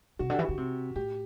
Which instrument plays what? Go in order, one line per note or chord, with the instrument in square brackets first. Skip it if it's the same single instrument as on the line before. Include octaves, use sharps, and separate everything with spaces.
[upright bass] C3 [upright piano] F#4
[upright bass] D3 [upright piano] G4
[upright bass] E3
[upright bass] D3 [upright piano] F#4
[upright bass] C3
[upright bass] A2 [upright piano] G4